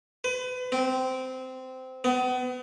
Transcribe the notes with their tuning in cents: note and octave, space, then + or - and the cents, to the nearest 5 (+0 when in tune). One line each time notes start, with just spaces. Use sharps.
B4 +35
C4 -15
B3 +35